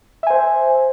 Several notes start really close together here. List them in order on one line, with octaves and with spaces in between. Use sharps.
E5 G#5 C5